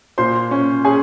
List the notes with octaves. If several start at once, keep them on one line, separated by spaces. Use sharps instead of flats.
A#2 C5 C6
C#4
C#4 G#4 G#5